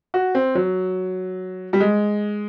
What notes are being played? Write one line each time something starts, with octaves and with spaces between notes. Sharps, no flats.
F#4
C4
F#3
G3
G#3